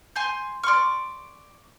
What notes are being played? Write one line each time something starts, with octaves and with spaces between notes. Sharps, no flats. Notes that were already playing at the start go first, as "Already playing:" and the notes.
G#5 C6 G6
D5 C6 C#6 F6